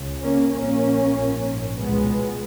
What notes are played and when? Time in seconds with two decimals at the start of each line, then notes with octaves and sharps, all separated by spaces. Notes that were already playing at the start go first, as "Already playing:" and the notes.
Already playing: C#2 C#3
0.22 A#3 C#4
0.53 A#1 A#2 A#3 C#4
1.15 A#1 G#2
1.77 C#2 B2 G#3 B3